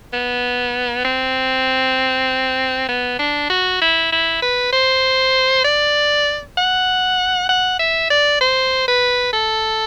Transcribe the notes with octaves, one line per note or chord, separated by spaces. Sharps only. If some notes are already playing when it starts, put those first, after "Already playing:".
B3
C4
B3
D4
F#4
E4
E4
B4
C5
D5
F#5
F#5
E5
D5
C5
B4
A4